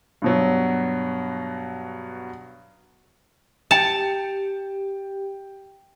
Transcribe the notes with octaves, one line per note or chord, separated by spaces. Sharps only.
G2 B2 F#3
G4 G5 A5 C#7 F7